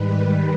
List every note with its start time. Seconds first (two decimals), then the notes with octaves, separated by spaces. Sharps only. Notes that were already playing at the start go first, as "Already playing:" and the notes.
Already playing: G#2 D#3 G3 B4